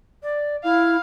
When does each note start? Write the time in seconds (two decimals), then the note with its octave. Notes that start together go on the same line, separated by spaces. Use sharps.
0.23 D5
0.64 E4 F5